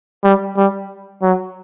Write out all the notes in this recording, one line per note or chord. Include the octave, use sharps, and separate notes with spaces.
G3
G3
F#3